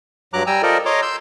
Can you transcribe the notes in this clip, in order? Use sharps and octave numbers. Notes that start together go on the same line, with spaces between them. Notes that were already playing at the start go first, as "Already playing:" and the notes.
G2 F#3 A#5 D6 F#6
G3 G5 G#5 A#5 E6
F4 A4 A#4 C5 D5 D#5
C#5 D#5 A#5 C6 D6
C6 E6 G6